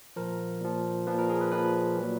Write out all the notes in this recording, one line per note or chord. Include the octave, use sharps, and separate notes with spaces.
A#2 F3 A#4
A#2 F3
A#2 F3 B4
A#4
G#4
B4
A#2 F3 B4
A#2 F#3